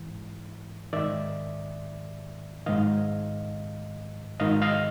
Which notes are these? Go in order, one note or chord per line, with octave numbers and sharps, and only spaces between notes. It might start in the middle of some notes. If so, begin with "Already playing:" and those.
Already playing: G#2 E3
G#2 D#3 D5 E5
G#2 D#3 D#5 F5
G#2 D#3 D#5 F5
D#5 F5